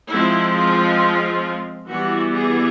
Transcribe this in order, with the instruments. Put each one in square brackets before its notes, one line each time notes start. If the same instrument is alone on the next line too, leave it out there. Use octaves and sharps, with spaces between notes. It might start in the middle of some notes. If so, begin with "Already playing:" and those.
[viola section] F3 G#3 C4 E4
F4
E3 G3 B3 F#4
G#4